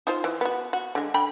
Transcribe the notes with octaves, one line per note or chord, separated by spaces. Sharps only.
D#4 F4 C5
E3
B3 F#4
F#4
D3 G#3
D3 G5 B5